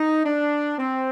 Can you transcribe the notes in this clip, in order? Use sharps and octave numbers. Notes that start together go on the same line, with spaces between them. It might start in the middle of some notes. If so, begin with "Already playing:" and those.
Already playing: D#4
D4
C4